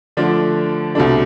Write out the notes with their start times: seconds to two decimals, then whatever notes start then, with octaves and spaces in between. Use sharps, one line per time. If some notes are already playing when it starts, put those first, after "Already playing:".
0.17 D3 F3 A3 D4
0.95 C2 B2 A3 D4